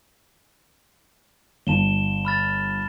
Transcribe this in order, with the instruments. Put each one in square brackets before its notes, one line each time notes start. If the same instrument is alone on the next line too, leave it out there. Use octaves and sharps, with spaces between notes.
[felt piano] G1 [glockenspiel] A5 E7 G7
[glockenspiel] B5 F6 A6